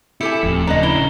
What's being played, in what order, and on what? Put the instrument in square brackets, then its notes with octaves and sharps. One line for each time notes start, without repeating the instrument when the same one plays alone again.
[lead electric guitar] E4 [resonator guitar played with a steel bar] G4 A4 G#5 [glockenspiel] C#7
[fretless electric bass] D#1 A2 [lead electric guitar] F2
[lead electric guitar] C#3 D4 [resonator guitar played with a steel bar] B4 D#5 [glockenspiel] A#5
[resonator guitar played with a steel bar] E4 [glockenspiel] G7